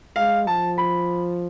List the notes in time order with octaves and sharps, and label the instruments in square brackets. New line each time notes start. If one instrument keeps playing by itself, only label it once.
[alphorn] G#3 [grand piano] F5
[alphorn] F3 [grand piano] A5
[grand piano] B5